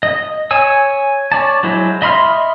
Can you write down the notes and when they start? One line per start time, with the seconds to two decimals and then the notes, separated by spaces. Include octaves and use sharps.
0.03 D#5
0.51 C#5 G#5 E6
1.32 C#5 D5 A5
1.63 F#3 G#3 E4 C5
2.02 D#5 E5 B5 C6 F6